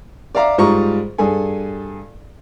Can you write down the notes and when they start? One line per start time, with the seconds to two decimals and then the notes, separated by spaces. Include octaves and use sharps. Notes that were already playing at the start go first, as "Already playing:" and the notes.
0.35 D5 E5 F5 A#5 D6
0.58 G#2 G3 F4 A#5 C#6
1.18 G2 G#4 A4 G#5